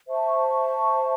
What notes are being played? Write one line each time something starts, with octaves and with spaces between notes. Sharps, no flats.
C5 E5 A5 C#6